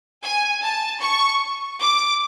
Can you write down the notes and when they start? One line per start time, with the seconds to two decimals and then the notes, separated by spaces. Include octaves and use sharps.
0.23 G#5
0.63 A5
1.02 C#6
1.81 D6